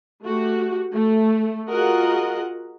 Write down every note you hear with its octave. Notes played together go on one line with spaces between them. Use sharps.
A3 F#4 G4
A3
F4 F#4 G#4 A#4 D#5 F#5